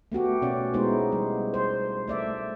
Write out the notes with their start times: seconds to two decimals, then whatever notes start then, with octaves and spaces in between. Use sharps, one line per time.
0.12 A3 B3 F#4 G4
0.42 B2 C#4 D5
0.74 G#3 B3 D#4 E4 C5
1.12 G3
1.54 C5
2.08 A3 D5 E5